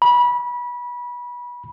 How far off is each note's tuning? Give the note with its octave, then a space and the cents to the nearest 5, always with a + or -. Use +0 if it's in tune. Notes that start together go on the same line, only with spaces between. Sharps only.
B5 -25